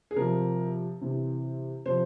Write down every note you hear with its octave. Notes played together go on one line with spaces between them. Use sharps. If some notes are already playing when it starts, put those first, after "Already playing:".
G#4
C3 F3 A#4
C3 E3
C3 F3 C5